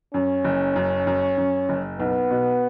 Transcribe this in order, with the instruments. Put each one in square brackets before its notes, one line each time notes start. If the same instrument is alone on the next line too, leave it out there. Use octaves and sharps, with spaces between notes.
[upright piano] F#2 [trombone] C#4
[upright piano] F#1
F#2
F#2
F#2
F#1
[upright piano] B1 [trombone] B3
[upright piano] B2